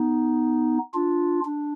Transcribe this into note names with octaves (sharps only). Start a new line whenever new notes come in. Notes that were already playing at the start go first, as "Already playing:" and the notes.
Already playing: B3 D#4
D4 F4
D4